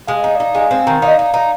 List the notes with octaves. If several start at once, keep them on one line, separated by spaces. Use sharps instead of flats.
G#3 F5
D#4 D#5
D#4 D5 F5
G#3 F5 G#5
C4
D#3
D#4 D5 F5
D#4
D#4